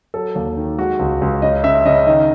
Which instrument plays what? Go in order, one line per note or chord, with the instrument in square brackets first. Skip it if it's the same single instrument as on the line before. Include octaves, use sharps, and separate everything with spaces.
[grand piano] F#3 A4
D#2
D#3
G#3 F#4
C#2
C#2
C#3 D#5
C#3 E5
C#3 D#5
D#3 D#5